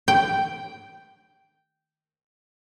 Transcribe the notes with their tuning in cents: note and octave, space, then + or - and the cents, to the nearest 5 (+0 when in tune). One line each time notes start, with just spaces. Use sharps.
G5 -5